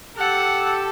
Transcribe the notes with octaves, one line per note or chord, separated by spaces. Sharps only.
G4 A4 F#5